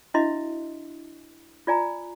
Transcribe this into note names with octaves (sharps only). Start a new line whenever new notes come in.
D4 E4 F#4 D#5 E5 C6
F4 D5 G#5 A#5